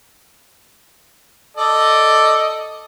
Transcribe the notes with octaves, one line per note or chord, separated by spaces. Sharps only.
A4 D5 D#5